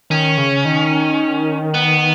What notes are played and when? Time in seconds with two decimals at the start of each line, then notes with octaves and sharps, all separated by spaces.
0.10 D#3 C#4
0.38 C#3
0.65 D#3
1.74 B3